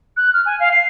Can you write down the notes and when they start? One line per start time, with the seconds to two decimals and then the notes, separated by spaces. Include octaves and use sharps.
0.17 F#6
0.33 F6
0.46 G#5
0.60 F5
0.71 C7